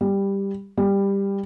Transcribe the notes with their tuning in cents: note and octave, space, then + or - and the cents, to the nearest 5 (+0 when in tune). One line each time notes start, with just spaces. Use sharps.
G3 +10
G3 +15